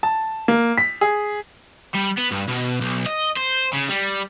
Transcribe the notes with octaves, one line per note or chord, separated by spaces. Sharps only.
A5
A#3
B6
G#4
G3
B3
G2
B2
B1
D#5
C5
C#3
G3